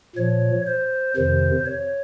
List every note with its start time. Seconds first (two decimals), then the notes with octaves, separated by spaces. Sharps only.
0.16 A#2 F3 C#5
0.66 C5
1.15 F2 C3 D#3 C5
1.65 C#5